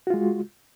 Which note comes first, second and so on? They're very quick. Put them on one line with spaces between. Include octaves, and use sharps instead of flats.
F#4 F4 G#3